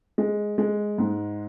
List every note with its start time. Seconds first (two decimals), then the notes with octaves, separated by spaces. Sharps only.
0.18 G#3
0.58 G#3
0.98 G#2